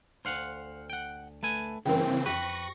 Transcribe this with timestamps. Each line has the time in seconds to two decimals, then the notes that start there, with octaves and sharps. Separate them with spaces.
0.25 D2 C5 F5 F#5
0.90 F#5 G5
1.43 A3 B4 G#5
1.85 G2 C#3 E3 A#3 C4 A#4 G5
2.26 F2 G4 B4 C#6 A#6